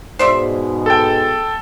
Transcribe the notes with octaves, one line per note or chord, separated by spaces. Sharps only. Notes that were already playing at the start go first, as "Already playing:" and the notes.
G#2 B2 G#3 C5 D5 E5
A4 G5